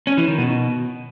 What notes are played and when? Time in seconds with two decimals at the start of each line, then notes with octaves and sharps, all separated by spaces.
0.07 C#4
0.17 E3
0.28 D#3
0.38 B2